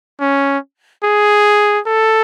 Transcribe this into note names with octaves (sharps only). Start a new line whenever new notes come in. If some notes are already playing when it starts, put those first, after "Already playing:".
C#4
G#4
A4